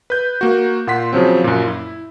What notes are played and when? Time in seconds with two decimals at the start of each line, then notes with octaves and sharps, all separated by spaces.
0.10 B4 G6
0.41 A#3 F#4
0.87 A#2 F#5 C6 B6
1.13 C#3 F3 F#3 C4
1.44 F#2 A#2
1.67 E4